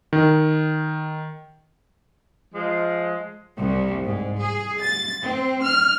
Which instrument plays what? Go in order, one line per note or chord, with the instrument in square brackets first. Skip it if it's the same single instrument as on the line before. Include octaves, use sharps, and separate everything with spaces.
[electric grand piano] D#3
[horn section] F3 G#3
[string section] C2
G#2
G#4
A6
C4
F6